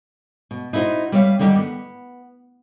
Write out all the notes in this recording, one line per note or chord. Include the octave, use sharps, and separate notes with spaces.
B2
D#4 E4 F#4 B4 C5
G3 B4 C#5 D#5 F5
D3 D#3 G3 D#4 G4
B3